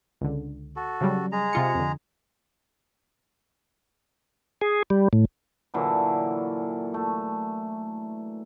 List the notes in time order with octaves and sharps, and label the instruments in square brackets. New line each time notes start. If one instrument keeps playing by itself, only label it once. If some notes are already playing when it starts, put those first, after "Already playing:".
[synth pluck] C#2 D3
[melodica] F#4 A4
[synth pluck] C#3 F#3 G3
[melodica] G#3 G#4 A#5
[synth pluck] C3 F4 C#7
F2 D3
[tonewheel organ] G#4
G3
A2
[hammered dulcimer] A#2 D3 E3 F#3
A3